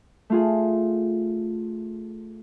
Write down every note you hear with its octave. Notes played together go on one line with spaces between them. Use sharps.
A3 F4 G#4